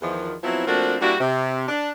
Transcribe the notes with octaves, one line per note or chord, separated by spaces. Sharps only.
E2 D#3 F3
F3 F#3 B3 C4 E4
F3 A3 A#3 C4 D4 F#4
G3 A#3 D4 E4 F#4
C3
D4